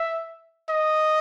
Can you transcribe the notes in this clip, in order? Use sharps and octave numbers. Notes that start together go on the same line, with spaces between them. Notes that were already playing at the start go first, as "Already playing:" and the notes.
Already playing: E5
D#5